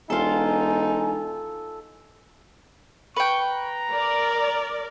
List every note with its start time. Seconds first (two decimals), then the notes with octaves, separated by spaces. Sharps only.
0.10 E1 D#4 F4 A4 G#5
3.16 B4 G5 C#6
3.51 A#5
3.92 A#4 D5